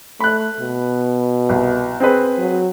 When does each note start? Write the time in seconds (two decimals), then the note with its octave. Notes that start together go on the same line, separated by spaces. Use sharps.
0.20 A3 B5 F#6
0.60 B2
1.49 C2
2.00 C4 G#4 B4
2.39 F#3